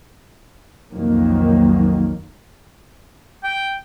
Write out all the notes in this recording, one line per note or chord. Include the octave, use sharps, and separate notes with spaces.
B1 F2 D#3 F#3 A#3
G5